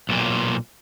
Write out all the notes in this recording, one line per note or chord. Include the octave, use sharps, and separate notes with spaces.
B1 A#2